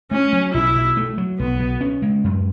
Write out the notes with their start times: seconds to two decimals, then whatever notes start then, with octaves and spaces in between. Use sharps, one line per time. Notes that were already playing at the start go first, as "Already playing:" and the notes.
0.11 A3 C#4
0.33 F#3
0.54 B1 E4
0.75 B2
0.97 A3
1.18 F#3
1.39 B1 B3
1.60 B2
1.81 C#4
2.02 G#3
2.24 F#2